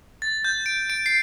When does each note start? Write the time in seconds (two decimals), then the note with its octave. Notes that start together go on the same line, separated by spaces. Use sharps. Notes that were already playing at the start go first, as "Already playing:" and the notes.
0.22 A6
0.45 G6
0.66 D7
0.90 D7
1.06 C7